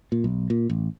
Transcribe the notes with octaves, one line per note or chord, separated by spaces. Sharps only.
A#2
B1
A#2
A1